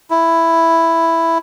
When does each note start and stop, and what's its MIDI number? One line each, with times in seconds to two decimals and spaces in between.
0.11 1.38 64